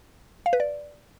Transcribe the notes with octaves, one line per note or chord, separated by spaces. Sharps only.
F5
B4
D5